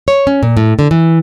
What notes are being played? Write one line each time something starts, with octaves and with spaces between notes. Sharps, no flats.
C#5
C#4
A#2
A2
D3
E3